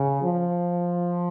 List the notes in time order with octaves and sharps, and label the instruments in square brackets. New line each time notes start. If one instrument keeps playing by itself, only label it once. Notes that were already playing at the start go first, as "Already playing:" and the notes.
Already playing: [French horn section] C#3
F3